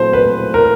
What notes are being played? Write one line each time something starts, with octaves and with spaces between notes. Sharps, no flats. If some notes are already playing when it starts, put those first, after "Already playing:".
Already playing: A#2 F#3 A3 C4 C5
B4
A#4